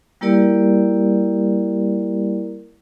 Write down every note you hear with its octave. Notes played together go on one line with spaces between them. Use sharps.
G3 A#3 E4 G4 A#4 D5